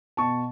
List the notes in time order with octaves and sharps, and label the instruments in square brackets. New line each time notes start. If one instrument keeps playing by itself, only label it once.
[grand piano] B2 A5 C#6